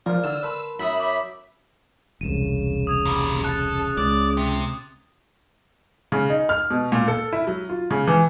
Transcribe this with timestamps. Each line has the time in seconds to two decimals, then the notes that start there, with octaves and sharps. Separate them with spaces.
0.06 F3 A#4 D5 F6
0.24 D3 E6
0.43 A#4 B4 A5 C6
0.79 F#2 E5 B5 D#6
1.00 C#5 D6
2.21 E1 C2 C#3 D#7 E7
2.87 D#6 G#6 F7
3.06 A#2 G3
3.44 A4 F#6 A6
3.97 C#2 D5 D#6 F#6 A6
4.37 C3
6.12 C#3
6.30 D#4
6.49 F6
6.70 B2
6.92 A#2
7.08 A4
7.33 E4
7.47 F#3
7.69 F4
7.90 C#3
8.08 E3